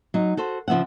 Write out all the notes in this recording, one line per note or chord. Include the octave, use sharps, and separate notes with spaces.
F#3 D#4
F#4 A4 C5
C#3 F3 B3 E5 F#5